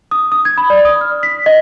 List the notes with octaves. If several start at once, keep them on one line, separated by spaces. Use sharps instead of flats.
D#6
D#6
G#6
B5
D5
D#6
F6
B6
D#5